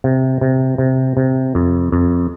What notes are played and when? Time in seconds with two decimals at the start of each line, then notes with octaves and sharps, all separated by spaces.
0.04 C3
0.41 C3
0.78 C3
1.17 C3
1.55 F2
1.92 F2